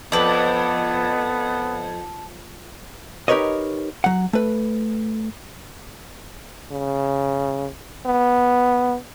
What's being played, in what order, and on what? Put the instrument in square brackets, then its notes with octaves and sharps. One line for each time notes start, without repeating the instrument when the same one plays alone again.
[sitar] F2 [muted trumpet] B3 [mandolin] B4 D5 [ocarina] A5
[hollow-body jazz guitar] D#4 G4 A#4 B4 C#5 D#5
F#3 F#5
A3 B4
[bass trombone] C#3
B3